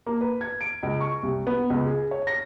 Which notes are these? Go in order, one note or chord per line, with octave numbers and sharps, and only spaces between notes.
A#3
B4
G#6
D7
C#2
C#6
C2
B3
C#2
G#4
C#5
A#6